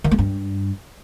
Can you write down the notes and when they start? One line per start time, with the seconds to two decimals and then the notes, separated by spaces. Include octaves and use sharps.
0.04 D#3
0.11 A3
0.18 G2